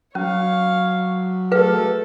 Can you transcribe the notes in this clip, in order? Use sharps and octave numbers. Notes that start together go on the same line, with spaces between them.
F#3 C#4 C#5 F5
A3 G#4 A4 B4 F5